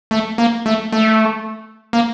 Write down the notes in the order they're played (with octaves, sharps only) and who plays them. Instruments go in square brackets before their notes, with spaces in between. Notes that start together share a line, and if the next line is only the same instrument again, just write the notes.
[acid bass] A3
A#3
A3
A3
A#3